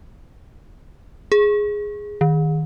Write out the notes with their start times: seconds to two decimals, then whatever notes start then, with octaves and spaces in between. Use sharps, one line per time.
1.32 G#4
2.21 D#3